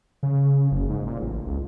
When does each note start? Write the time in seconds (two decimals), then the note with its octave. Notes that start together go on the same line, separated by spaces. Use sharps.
0.23 C#3
0.71 F#1
0.89 G#2
1.07 A#2
1.22 A1
1.47 C#2